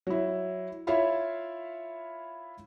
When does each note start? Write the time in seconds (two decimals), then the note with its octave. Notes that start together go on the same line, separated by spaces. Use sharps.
0.07 F#3 E4
0.87 E4 F4 C#5 E5 F5 B5